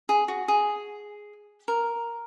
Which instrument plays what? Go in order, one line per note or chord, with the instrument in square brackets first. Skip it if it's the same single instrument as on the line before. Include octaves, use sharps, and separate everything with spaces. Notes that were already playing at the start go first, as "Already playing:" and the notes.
[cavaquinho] G#4
F#4
G#4
A#4